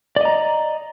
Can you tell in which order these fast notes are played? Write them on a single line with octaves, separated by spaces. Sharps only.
D5 D#5 A#5